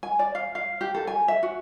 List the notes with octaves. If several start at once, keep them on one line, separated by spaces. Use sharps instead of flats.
G#5
D5
F5
F5
G4
A4
G#5
E5
F#4